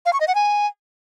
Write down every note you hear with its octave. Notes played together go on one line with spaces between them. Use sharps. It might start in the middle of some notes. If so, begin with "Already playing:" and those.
F5
C#6
D#5
F#5
G#5